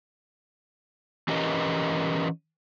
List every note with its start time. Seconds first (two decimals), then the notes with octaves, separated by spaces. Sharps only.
1.28 E3 C#4 G4 A#4 B4 D#5